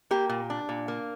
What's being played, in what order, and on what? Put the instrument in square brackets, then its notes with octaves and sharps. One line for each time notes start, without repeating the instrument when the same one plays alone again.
[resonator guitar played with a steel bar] A#3 G4
A#2
D4
A#2
A#3